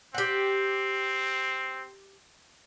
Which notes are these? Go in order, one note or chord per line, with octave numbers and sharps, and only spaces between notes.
C4 G4 F#5